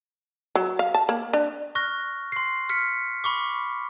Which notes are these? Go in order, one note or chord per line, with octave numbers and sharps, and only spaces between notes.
F#3
F5
A5
A#3
D4
C#6 F6 F#6 A#6
C6 C7
F6 B6 C#7
B5 C#6 D6